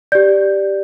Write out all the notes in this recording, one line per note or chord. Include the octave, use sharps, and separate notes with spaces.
G4 D5 G6